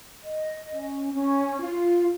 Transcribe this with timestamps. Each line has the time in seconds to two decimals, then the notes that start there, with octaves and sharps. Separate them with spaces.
0.24 D#5
0.69 C#4
1.14 C#4
1.59 F4